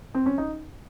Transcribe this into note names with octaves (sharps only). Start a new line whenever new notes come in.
C4
C#4
D#4